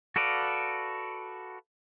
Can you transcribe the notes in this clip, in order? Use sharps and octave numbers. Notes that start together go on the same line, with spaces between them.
F#4 A4 B4 D5 F5